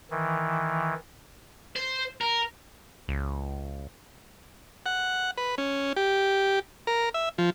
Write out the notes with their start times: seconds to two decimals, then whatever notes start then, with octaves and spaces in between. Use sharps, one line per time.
0.11 D#3 E3
1.76 C5
2.21 A#4
3.08 C#2
4.86 F#5
5.38 B4
5.58 C#4
5.96 G4
6.87 A#4
7.14 E5
7.38 F3